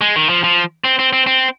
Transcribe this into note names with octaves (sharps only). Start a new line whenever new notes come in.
G#3
D#3
F3
F3
C4
C4
C4
C4